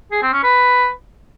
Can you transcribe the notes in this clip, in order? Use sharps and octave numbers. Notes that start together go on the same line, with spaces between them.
G#4
C4
C#4
B4